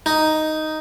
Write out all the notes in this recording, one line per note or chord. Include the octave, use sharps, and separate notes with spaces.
D#4